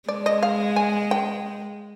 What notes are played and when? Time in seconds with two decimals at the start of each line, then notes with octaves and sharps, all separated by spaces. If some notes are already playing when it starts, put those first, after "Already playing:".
0.09 G#3 D5
0.26 D#5
0.43 F5
0.76 G#5
1.11 G5